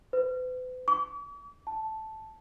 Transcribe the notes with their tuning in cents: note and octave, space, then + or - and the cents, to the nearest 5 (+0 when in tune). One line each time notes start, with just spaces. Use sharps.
B4 +45
D6 -45
A5 -5